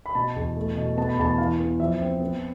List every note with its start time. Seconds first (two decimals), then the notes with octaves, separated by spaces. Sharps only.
0.06 B5
0.15 B2 A5
0.36 E2
0.57 A3
0.77 B2
0.97 B3 A5
1.09 B5
1.19 E2 A5
1.38 E3 F5
1.60 B3
1.80 F3 E5
2.01 C4
2.20 B3